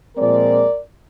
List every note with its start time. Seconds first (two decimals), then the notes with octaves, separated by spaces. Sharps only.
0.16 A#2 F3 G#3 C4 A#4 D5